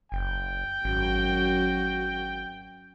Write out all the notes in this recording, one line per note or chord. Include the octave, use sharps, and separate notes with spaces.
F#1 G5
G#1 F#2 F#4